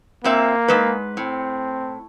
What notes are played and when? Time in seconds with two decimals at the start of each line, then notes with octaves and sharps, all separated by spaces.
0.24 A#2 A#3 C4 E5
0.68 G#2 G#3 B4
1.17 A2 C4